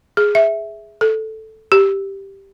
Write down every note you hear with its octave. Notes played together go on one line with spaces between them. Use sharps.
G#4
E5
A4
G4